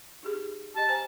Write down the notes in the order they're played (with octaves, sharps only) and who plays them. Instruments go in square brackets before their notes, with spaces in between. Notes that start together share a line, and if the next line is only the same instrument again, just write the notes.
[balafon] D#4 G4 G#4
[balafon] G4 D#5 [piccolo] A5
[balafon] C5 G#5 A#5